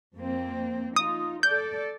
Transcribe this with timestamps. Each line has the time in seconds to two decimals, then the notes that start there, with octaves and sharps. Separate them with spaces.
0.15 F2 A#3 C4
0.96 D#4 F4 D#6
1.43 A4 D5 G6